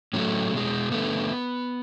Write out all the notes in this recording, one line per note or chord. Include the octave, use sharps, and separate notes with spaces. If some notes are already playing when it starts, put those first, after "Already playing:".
A2 F#3 A3 C#4
B2 G#3
D3 A3 B3